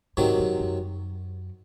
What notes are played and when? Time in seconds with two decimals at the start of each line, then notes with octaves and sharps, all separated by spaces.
0.17 G#2 C3 D#3 F#3
0.38 F#2
0.59 F#2